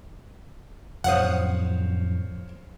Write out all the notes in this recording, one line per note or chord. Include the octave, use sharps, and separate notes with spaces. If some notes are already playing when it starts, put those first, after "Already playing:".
F2 A2 F#3 C5 C#5 F5 F#5 D#6